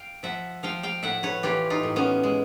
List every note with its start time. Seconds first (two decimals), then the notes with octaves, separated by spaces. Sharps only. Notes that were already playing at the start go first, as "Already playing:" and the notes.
Already playing: F5 G5
0.23 F3 E5 F#5
0.63 F3 F5 G5
0.83 F5 G5
1.03 A2 E5 F#5
1.23 B4 C#5
1.43 E3 F4 G4
1.70 D#4 F4
1.83 A2
1.96 B3 C#4
2.23 G#3